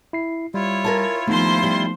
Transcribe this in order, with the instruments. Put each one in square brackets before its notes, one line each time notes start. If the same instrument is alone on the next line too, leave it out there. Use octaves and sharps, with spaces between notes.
[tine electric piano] E4 C7
[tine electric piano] G3 [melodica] E4 F4 [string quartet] C#5
[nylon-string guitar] A#4 G#5 A5
[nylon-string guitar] D#2 [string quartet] F3 C5 C6 [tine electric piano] A3 B3 D#4
[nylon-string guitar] G3